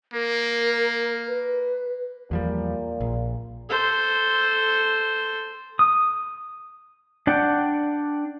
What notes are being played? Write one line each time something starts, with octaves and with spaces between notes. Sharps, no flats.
A#3 A#4
B4
E2 A#2 F3 G3
A#1
A4 C5
D#6
D4 D5 F#5 G5